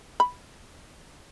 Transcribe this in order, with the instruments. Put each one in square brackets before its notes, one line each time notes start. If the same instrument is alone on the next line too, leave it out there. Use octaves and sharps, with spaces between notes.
[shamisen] B5